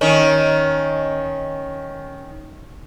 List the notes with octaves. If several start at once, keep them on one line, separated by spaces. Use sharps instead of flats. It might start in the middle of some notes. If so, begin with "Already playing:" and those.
D#3 C#4